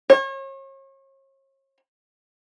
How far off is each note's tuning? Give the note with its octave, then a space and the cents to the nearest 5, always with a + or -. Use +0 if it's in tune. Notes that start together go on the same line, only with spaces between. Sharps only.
C#5 -40